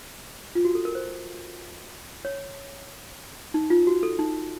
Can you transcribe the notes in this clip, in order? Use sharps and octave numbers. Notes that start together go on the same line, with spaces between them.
F4
F#4
A4
A#4
C5
C#5
D#4
F4
F#4
A4
D#4